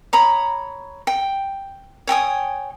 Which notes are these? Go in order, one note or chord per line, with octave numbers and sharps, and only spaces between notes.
C#5 A#5 B5 D#6
G5
C#5 G5 G#5 D#6